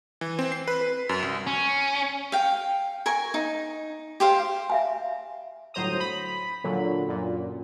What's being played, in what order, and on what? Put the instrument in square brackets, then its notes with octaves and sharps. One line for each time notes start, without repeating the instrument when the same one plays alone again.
[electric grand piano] E3
C4
C7
B4
B4
F#2
C2
[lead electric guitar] C#4
[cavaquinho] F5 G5
A#4 G#5 C#6
D#4
G4 C5 F5
[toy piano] E5 F5 G#5
[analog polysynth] G1 A2 F#3 C5 A#5 D#6
B5
A#2 D3 F#3
F#2 A#2